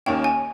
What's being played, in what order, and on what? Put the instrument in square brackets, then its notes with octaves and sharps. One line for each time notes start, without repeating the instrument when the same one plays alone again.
[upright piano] D#2 D#3 A#3 C#4 [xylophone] G5
[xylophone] G#5